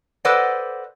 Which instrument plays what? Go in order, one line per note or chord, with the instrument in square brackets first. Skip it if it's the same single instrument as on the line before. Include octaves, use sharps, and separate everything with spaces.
[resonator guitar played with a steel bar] A4 B4 C5 D5 D#5 F#5